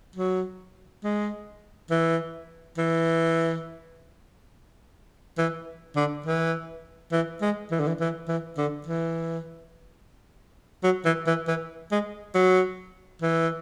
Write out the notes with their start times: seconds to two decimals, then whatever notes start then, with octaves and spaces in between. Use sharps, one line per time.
0.16 F#3
1.04 G#3
1.90 E3
2.78 E3
5.38 E3
5.96 D3
6.26 E3
7.12 E3
7.42 G#3
7.71 E3
7.80 D3
7.88 E3
8.00 E3
8.28 E3
8.58 D3
8.86 E3
10.83 F#3
11.05 E3
11.27 E3
11.48 E3
11.92 G#3
12.35 F#3
13.22 E3